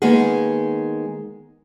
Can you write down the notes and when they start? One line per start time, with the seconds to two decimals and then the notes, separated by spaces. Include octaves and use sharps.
0.02 D#3 G#3 A#3 B3 C#4 G#4